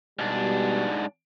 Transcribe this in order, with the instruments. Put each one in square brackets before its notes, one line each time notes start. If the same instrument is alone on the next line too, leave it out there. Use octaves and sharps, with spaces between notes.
[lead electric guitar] G#2 D4 [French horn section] B2 G3